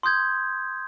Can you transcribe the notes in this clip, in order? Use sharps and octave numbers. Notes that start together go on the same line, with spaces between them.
C6 D#6 G6 G#6